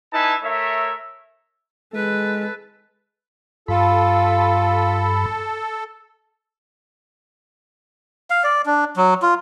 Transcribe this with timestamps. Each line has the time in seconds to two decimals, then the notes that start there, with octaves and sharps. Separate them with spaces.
0.13 D#4 E4 B4 E5 G#5 A5
0.43 A3 A#4 C#5 E5
1.94 G#3 A4 B4
3.68 G2 F4 A4 B5
8.30 F5
8.44 D5
8.66 D4
8.96 F#3
9.22 F4